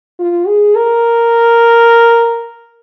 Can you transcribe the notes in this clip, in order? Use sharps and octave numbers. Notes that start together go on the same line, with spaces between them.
F4
G#4
A#4